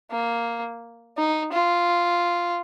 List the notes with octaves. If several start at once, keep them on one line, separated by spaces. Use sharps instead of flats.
A#3
D#4
F4